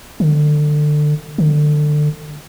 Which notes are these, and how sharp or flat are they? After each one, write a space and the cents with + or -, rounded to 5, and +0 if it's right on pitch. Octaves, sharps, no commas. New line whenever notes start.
D3 +25
D3 +25